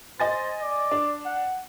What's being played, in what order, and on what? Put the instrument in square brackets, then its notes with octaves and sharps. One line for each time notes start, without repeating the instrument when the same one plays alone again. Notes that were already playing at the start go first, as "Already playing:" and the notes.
[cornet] C5 [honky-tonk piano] D#5 G#5 A6
[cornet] D5
[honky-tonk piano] D4
[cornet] F#5